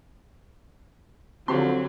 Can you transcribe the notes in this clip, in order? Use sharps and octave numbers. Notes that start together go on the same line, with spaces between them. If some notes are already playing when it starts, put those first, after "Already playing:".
D3 F3 F#3 C4 G4 C6